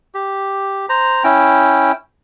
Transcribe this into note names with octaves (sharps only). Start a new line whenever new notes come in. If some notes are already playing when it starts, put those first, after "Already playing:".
G4
C5 A#5
C#4 E4 G5